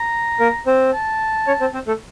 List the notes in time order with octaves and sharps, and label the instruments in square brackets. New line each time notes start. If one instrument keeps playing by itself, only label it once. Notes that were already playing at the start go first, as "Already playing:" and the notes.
Already playing: [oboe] A#5
[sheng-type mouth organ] A#3 A#4
C4 C5
[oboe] A5
[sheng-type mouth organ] C#4 C#5
C4 C5
C4 C5
A3 A4